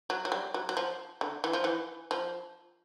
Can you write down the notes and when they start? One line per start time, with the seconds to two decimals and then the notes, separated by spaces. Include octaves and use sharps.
0.10 F#3
0.25 F#3
0.32 G3
0.54 F#3
0.69 F#3
0.77 F3
1.21 D3
1.44 E3
1.53 F3
1.64 E3
2.11 F3